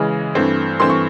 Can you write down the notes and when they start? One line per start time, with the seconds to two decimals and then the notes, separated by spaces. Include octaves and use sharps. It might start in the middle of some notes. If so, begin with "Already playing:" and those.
Already playing: C#3 E3 G#3
0.35 G2 E3 A3 C4
0.80 G2 E3 A3 C4 C6
0.90 C#6